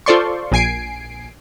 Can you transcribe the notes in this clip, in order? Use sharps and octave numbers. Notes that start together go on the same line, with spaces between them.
F4 A4 C5 D5 C6 C#6
A#1 A#2 G#5 C7 D7